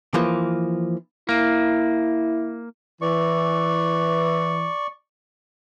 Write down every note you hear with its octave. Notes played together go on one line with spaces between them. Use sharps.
E3 F3 A#3
A#3 E4
E3 D5 C#6